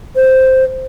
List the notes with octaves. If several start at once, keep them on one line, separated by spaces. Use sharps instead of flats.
C5